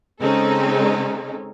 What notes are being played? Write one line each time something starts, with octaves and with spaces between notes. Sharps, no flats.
C#3 G#3 C4 C#4 D#4 A4